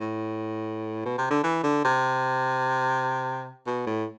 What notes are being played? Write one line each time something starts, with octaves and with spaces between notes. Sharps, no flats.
A2
B2
C3
D3
E3
D3
C3
B2
A2